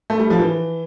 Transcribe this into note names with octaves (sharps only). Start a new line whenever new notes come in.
A3
G3
F3
E3